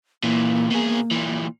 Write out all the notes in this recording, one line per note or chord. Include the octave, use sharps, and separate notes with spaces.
A#2 E3 A#3
B2 G#4
A#2 E3